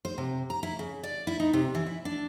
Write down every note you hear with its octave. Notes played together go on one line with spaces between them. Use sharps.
C5
C3
A#5
E4
C#3
D5
E4
D#4
C3
E3
E4
D4